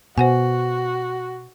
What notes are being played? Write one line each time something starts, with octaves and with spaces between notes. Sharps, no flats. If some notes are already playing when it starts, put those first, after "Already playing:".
B2 F#4 C5 F#5 G#5